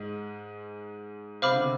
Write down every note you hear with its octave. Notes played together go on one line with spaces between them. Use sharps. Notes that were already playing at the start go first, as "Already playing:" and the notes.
Already playing: G#2 G#3
C3 C5 F5 B5 D6 F6
D3
C3